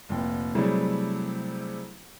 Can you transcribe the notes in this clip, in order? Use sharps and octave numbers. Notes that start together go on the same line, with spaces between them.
F1 A#2 G5
C3 F#3 G3 A3 E4 G#4